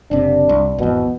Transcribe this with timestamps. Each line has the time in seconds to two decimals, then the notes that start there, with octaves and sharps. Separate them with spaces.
0.11 F#1 C3 D4
0.49 C2
0.78 G#1 E2 B2